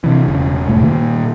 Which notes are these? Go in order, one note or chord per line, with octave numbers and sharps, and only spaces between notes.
C3 E3
E1 C#3
E1 G2 A3
A#2 D#3 A#3